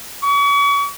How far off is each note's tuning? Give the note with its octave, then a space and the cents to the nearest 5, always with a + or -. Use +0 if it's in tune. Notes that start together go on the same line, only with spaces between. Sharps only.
C#6 +40